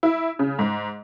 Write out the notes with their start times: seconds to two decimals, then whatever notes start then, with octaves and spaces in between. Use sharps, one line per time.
0.03 E4
0.39 C#3
0.59 G#2